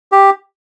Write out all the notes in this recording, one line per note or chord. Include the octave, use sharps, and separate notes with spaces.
G4